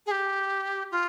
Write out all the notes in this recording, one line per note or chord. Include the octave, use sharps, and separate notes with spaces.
G#4
G4
F4